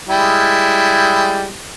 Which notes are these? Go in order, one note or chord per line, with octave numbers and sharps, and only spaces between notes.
G3 G#3 E4